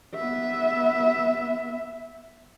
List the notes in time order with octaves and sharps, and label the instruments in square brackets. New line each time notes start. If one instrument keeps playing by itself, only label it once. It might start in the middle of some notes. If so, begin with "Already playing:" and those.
[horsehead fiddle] B3 E5